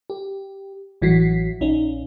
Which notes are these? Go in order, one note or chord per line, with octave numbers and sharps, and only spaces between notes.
G4
A1 E3 F#3 F#4 B6 C7
A#1 C#4 D#4